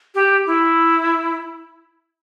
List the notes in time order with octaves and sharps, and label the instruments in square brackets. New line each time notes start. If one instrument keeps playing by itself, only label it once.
[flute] G4
E4